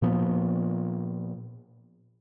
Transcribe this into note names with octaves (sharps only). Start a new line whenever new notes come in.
A#2 F3 B3